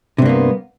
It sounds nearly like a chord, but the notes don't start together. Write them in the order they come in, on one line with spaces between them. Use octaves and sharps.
C3 G2 A#3 B3